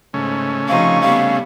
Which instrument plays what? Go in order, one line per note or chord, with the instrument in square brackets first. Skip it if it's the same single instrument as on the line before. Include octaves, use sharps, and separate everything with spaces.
[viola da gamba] G#2 [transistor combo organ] C#3 A3 C#4
[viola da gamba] C3 F3 D#4 [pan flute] F5 [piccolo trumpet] C#6
[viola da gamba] G3 B3 [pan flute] F5